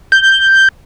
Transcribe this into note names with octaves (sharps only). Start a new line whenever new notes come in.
G6